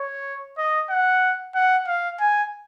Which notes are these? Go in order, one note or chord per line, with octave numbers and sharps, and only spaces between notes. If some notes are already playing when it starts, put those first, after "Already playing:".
Already playing: C#5
D#5
F#5
F#5
F5
G#5